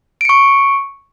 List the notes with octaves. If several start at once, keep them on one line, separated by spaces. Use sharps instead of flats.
C#6 C#7 D7